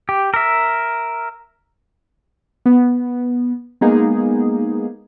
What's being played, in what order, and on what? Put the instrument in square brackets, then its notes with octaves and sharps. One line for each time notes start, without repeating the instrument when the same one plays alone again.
[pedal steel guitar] G4
A#4 E5
[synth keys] B3
G#3 A#3 B3 D#4 G#4